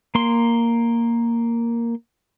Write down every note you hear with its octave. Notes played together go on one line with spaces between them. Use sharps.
A#3 C6